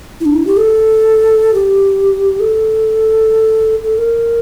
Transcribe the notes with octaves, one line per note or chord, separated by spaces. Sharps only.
E4
D4
E4
G4
A4
G4
A4
A4
A#4